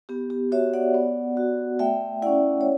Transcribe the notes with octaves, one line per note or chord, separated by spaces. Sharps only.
B3 G4
G4
F#4 C#5 E5
D5 F#5
B3
F#4
A3 E5 G5
C#4 E4 D5 F#5
C#5